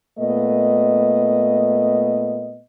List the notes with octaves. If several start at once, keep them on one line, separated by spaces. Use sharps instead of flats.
A#2 A3 B3 D#5